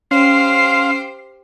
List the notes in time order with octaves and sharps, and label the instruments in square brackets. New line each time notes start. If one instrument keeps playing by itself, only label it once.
[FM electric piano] C#4 [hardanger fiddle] G4 C5 [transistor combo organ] F5 C6 [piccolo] C7